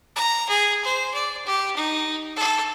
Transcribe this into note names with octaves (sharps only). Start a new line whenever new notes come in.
A#5
G#4
C5
D5
G4
D#4
A4